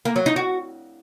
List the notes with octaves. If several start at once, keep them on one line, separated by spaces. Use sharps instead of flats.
A#3
F#3
D#4
F#4